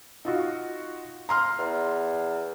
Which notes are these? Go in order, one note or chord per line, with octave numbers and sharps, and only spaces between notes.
D#4 F4 F#4
A#5 C6 F6
E2